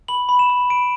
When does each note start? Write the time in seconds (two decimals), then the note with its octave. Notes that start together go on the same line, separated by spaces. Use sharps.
0.08 B5 F#7
0.29 B5
0.39 E7
0.50 B5
0.70 B5 D7